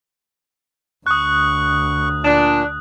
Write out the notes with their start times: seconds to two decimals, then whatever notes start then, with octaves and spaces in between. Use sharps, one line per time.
1.07 D2 C#6 D#6 F#6
2.24 A#2 D4